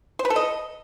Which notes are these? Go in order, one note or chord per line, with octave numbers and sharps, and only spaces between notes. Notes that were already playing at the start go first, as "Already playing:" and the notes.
C5
B4
A4
D#5